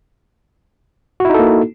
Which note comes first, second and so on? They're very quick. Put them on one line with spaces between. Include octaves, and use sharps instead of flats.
F#4 E4 D#4 A4 A#3